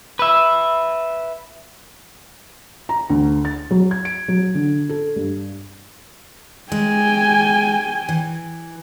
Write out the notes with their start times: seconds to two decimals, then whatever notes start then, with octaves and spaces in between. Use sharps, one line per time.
0.19 B4 E5
2.89 A#5
3.10 D2
3.45 A6
3.71 F#3
3.91 G#6
4.05 D7
4.28 F#3
4.55 D3
4.89 A4
5.16 G2
6.72 G#3 G5 G#5
8.09 E3